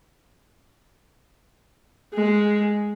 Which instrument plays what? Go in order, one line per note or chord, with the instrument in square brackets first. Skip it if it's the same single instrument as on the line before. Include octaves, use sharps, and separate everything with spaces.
[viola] G#3